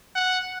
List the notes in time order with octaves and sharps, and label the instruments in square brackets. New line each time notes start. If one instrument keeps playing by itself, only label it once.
[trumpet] F#5